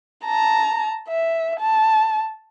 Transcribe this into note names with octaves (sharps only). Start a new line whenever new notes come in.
A5 A#5
E5
A5